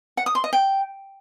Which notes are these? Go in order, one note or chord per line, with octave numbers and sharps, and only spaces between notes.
F#5
D#6
C6
D#5
G5